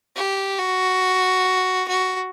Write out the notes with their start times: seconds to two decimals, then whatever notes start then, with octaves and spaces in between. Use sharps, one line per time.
0.16 G4
0.59 F#4
1.88 F#4